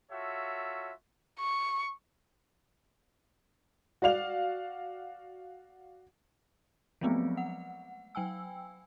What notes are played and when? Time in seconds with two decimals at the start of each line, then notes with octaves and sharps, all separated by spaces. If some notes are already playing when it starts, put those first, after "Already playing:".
0.11 F4 F#4 A4 C#5 E5
1.40 C#6
4.02 F#4 D5 F5 F7
7.01 F3 F#3 G#3 A3 B3 C4
7.37 F#5
8.15 F#3 G5 G#5 E6